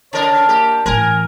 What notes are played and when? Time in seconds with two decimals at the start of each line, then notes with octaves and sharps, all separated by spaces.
0.13 C#3 D4 A#4 C#5
0.49 A#3 G4
0.86 A2 E3 A#4 G#5